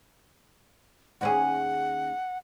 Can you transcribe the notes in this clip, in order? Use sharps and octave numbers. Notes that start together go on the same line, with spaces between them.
D#2 C#4 G#4 F#5